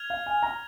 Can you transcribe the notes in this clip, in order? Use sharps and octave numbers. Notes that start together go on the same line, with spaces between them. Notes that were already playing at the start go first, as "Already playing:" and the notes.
Already playing: F6 G#6 F7
F5
G#5
A#5